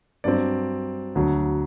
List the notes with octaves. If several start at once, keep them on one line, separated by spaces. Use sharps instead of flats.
G2 F#3 C4 D5
D2 D3 F#3